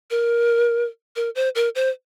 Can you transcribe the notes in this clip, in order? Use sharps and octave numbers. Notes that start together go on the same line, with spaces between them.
A#4
A#4
C5
A#4
C5